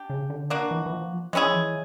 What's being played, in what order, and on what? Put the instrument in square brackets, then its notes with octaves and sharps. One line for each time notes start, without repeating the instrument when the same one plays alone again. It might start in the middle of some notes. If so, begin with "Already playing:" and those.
Already playing: [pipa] D4 G4
[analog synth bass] C#3
D3
[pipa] A#3 D4 F#4
[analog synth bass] E3
E3
F3
[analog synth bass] F3 [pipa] G#3 C#4 E4 G#4
[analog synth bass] E3